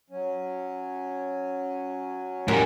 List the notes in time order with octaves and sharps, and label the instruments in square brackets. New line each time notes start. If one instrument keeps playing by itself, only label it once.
[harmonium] F#3 C#4
[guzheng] F#2 [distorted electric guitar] A2 G3